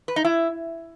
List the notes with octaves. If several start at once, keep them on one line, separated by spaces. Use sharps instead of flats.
B4
D#4
E4